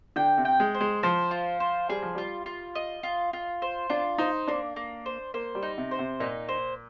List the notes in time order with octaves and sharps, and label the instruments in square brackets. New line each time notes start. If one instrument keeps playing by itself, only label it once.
[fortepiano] D3 [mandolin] G5
[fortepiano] C3
[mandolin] G5
[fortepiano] G#3
[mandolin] C5
[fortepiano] G#3
[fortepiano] F3 [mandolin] C5
[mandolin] F4
C5
[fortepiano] G3 [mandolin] G#4
[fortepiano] F3
[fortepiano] G3 [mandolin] F4
[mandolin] F4
D#5
F4
F4
C5
[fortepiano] D4 [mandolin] F4
[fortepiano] D#4 [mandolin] C5
[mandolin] A#3 [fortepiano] D4
[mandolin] A#3
C5
[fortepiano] A#3 [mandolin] C5
[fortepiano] G3
[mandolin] D#4
[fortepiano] C3
[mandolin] C5
[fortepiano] C3
[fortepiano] A#2 [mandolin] D#4
[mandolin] C5